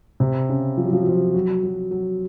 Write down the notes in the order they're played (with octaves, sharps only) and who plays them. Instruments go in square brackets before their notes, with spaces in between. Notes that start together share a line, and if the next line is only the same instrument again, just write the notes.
[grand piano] C3
C#3
F3
F#3
F3
F#3
F3
F#3
F#3
F#3